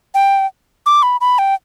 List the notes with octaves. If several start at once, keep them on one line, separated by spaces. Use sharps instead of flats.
G5
D6
B5
B5
G5